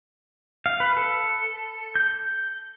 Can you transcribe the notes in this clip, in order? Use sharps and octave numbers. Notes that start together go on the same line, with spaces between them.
F5
B4
A4
G6